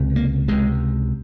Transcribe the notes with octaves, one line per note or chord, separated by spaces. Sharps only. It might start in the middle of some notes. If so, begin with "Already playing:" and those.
Already playing: C#2 C3
A#3
C#2 C3 G#3